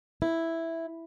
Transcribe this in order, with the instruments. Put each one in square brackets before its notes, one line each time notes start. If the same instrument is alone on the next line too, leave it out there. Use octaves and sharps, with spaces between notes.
[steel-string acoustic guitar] E4